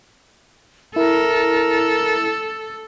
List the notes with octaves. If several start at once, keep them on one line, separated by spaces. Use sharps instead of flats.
E4 A4 A#4